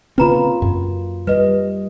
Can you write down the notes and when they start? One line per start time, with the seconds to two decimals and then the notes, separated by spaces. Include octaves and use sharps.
0.18 C#3 A#3 C4 F4 B4 A#5 B5
0.62 F#2
1.27 G3 B4 D#5